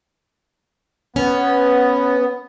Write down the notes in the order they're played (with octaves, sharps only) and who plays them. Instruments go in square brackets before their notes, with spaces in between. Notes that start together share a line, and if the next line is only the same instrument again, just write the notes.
[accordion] B3 [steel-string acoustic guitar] C#4